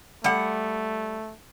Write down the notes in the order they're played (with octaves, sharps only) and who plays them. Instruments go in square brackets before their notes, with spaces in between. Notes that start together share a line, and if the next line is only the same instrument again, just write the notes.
[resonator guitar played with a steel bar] G3 F#5 [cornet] A3